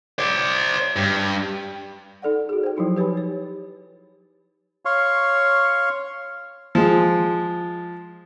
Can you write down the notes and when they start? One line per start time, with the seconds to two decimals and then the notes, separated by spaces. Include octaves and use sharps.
0.19 C5 D5
0.96 G2
2.22 D#4 A4 D5 F#5
2.49 F#4 G#4
2.63 C5 G5
2.77 F3 F#3 D#4 E4
2.96 G4 B4 C#5 G#5 B5
3.17 C#5
4.85 C#5 F5 C6 C#6
6.75 F3 G#3